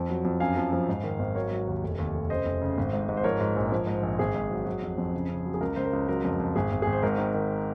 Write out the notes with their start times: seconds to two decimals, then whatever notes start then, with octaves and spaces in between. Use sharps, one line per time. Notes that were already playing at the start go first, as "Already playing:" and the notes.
Already playing: F2 F3
0.10 F#3
0.25 F2
0.40 F#2 F5 G#5
0.57 F3
0.73 F3
0.89 G#2
1.03 D#3
1.19 G#1
1.35 F#3 A#4 C#5
1.51 F#3
1.68 D#2
1.83 F1
1.98 D#2
2.15 F1
2.30 C#3 C5 D#5
2.46 F1
2.62 C#3
2.77 G#1
2.93 G#2
3.09 G#2
3.17 C5
3.24 F3 A#4 C#5
3.41 G#2
3.56 A#1
3.72 F3
3.87 G#2
4.03 A#1
4.19 G#1 G#4
4.35 G#2
4.50 F#3
4.66 F#3
4.82 F2
4.98 F2
5.14 C#3
5.29 C#3
5.45 F#3
5.54 G#4
5.60 C#2 A#4
5.76 C#2 C5
5.85 A#4
5.93 C#2
6.08 F#3 A#4
6.25 F2
6.40 F2
6.56 G#1 G#4
6.72 G#1
6.82 G#1 G#4
6.93 C5
7.03 G#2 A#4
7.18 D#3
7.34 D#3